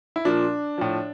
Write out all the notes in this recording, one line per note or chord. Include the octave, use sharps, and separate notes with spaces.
E4
A#2 F3 D4
A2 F3